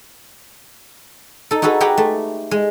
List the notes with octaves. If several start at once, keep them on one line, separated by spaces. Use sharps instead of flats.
D#4 A4
D#4 F#4 G#4 A4 B4
G4 G#4 B4 F#5 G5 A#5
A3
G#3